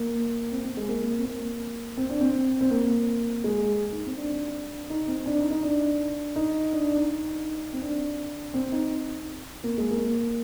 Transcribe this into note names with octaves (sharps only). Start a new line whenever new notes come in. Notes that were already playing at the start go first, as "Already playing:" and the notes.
Already playing: A#3
C4
C4
G#3
A#3
C4
A#3
C4
D4
C4
C4
A#3
G#3
D#4
C4
D4
D#4
C4
D4
D#4
D#4
D4
D#4
D4
D4
D#4
C4
D4
C4
D#4
A#3
G#3
A#3